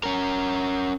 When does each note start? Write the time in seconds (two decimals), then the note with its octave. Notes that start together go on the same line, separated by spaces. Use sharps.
0.04 C#4 A#4